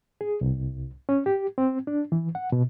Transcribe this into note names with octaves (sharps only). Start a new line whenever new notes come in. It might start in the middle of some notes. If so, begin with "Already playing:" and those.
G#4
C2
C#4
G4
C4
D4
E3
F#5
B2